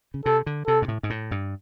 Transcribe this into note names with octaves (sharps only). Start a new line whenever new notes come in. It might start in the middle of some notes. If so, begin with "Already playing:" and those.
C#3
C3 A4
D3
C3 A4
G#2
A2
G#2
A2
G2